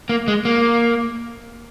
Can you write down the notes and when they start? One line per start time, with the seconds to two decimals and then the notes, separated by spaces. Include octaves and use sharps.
0.09 A#3
0.28 G#3
0.45 A#3